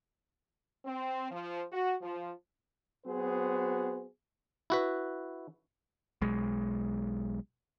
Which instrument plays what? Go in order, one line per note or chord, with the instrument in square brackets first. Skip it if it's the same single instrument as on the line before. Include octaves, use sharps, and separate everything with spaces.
[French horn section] C4
F3
F#4
F3
[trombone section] F#3 B3 C4 F#4 G#4 C5
[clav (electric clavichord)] E4 F#4 B4
[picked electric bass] B1 G#3